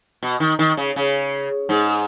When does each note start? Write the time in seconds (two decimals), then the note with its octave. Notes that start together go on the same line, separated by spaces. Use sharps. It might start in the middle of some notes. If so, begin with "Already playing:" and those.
0.23 B2
0.40 D#3
0.59 D#3
0.77 C#3
0.96 C#3
1.69 G#2